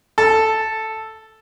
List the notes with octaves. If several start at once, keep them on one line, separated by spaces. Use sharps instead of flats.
A4